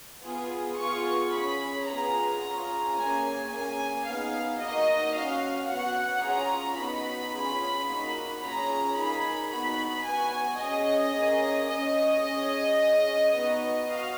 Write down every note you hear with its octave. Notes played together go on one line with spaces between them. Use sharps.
B3 F4 G#4
B3 F4 G#4 C#6
C#4 G#4 B5
B3 F4 G#4 A#5
C#4 F4 G#4
A#3 C#4 G#4 G#5
A#3 C#4 G#4 G#5
B3 D#4 G#4 F5
A#3 D#4 F#4 D#5
C#4 F#4 F5
B3 F#4 F#5
C#4 F4 G#4 A#5
B3 D#4 F#4 B5
C#4 F4 G#4
A#3 D#4 F#4
C#4 F4 G#4 A#5
A#3 D#4 G#4 B5
B3 D#4 F#4 B5
B3 F#4 G#5
C#4 G#4 D#5
A#3 C#4 G#4
C#4 G#4 D#5
C#4 G#4
C#4 G#4
B3 D#4 F#4
F#4 F5